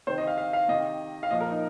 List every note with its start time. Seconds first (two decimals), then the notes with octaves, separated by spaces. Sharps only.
0.07 C3 D#3 C5
0.18 D#5
0.27 F5
0.38 F5
0.53 F5
0.68 C3 D#3 D#5
1.23 F5
1.31 A#2 F3 D#5
1.41 A#4
1.51 D#4